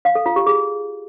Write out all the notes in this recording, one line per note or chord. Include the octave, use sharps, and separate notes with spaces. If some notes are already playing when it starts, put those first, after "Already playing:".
F5
A4
F4
G4
G#4